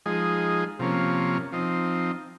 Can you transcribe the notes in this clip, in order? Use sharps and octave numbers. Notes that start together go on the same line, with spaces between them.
F3 G#3 D#4 G#4
C3 F3 A#3 C#4
F3 C4 D#4